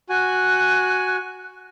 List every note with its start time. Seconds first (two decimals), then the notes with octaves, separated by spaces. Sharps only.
0.10 F#4 G#5 F#6